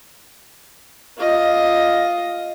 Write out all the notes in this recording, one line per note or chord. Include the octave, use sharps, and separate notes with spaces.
F4 D#5